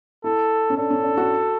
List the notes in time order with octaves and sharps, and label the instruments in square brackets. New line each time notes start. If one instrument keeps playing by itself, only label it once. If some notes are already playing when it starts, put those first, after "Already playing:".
[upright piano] E4 [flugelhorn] A4
[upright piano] C#4
[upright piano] D4 [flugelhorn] A4
[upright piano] C#4
D4
F#4